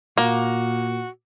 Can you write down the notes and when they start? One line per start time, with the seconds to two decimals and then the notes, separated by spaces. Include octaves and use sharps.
0.18 A#2 A#3 F#4